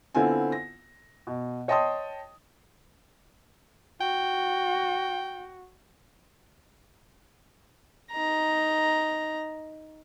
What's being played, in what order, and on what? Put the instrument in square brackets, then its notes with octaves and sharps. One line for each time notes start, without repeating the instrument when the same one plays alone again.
[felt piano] D3 B3 C4 E4 F4 G#5
A#6
B2
C#5 D#5 G5 A5 C6 D#6
[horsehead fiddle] F#4 [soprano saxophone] G5
[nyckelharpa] D#4 A#5